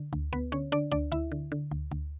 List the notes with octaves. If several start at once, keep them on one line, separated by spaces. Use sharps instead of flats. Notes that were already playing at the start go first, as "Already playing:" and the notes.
Already playing: D3
D2
D2 B3 B4
D3 C#4 C#5
D3 D4 D5
D2 D4 D5
D2 E4 E5
D3
D3
D2
D2